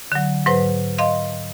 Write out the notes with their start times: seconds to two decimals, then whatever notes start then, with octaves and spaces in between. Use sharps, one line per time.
0.12 D3 F#3
0.46 G#2 F#3 B4 C5
0.98 D#5 F5 C6